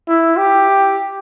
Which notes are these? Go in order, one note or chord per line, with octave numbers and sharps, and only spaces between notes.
E4
G4